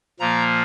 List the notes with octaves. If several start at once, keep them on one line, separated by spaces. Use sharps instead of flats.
A#2 F3 A#3 A#5